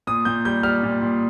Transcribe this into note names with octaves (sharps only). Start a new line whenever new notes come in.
A#2 D#6
A#2 G6
G3 G6
G3 F6
A#2
A#2